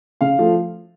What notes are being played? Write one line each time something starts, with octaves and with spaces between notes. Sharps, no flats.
C#3 F5
F3 A3